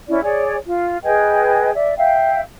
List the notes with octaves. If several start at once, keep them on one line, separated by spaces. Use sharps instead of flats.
C#4 E4 D5
G#4 C#5 D5
F4
G#4 B4 D#5 G5
D5 E5
E5 F5 G5